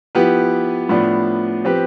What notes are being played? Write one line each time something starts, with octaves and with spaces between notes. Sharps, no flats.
F3 B3 E4 G4 B4
A2 F3 B3 D4
F3 C4 G4 B4